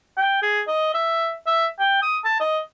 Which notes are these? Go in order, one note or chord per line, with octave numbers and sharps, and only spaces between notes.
G5
G#4
D#5
E5
E5
G5
D#6
A5
D#5